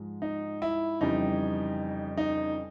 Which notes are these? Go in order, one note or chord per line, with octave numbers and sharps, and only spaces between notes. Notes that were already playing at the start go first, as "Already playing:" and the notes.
Already playing: G#2 F3 G#3
D#4
E4
F2 C#3 E3 G3 D#4
D#4